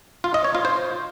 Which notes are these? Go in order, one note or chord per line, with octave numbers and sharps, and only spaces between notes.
F4
D#5
C#5
F4
C5